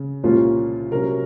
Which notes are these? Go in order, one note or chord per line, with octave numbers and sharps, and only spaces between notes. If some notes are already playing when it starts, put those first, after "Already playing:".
Already playing: C#3
C2 A#2 F3 A#3 C#4 F4
C3 F#3 C#4 A#4